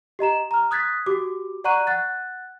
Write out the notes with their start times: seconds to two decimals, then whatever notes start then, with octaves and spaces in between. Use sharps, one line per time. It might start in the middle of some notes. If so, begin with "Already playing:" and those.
0.19 G4 D#5 A#5 E7
0.51 A#5 F6
0.71 D#6 F#6 G#6 A6 B6
1.06 F#4 G4 D6
1.64 D5 F#5 A#5 C#6 F#6 D#7
1.87 F#5 F#6 A6